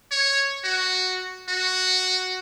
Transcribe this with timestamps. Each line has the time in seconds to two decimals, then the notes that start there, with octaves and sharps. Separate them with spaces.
0.11 C#5
0.64 F#4
1.49 F#4